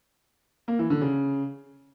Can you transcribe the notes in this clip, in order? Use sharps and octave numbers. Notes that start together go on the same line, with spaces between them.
A#3
E3
D3
C#3